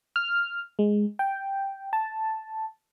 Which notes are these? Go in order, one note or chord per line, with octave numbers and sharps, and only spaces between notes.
F6
G#3
G5
A5